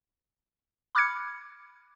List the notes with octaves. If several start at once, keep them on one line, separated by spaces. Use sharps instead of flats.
B5 D6 F6 F#6 G#6 C#7